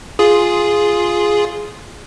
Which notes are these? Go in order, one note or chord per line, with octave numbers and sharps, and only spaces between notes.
F4 G#4